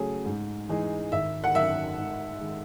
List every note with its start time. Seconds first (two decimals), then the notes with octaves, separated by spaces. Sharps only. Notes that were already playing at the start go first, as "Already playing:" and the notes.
Already playing: C#3 F#3 A3 C#4 G#4
0.26 G#2
0.69 E3 G#3 D#4 G#4
1.12 G#1 E5
1.44 F#5
1.55 F#2 D#3 E5
1.98 G#2
2.41 D#3 G#3